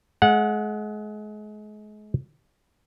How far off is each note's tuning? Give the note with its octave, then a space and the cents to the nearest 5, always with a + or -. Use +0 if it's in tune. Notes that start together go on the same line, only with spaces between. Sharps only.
G#3 +35 F#5 -20